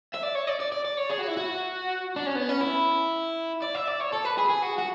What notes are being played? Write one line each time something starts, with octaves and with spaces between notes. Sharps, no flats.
E5
D5
C#5
D5
D5
D5
D5
C#5
G#4
F#4
E4
F#4
D4
C#4
B3
C#4
E4
D5
E5
D5
C#5
A4
B4
G#4
G#4
F#4
F#4